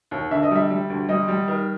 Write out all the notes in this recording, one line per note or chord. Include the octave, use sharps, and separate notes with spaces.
D#2
D3 E5
D#5
G3 E5
G3
D2
G3 D#5
G3
D#3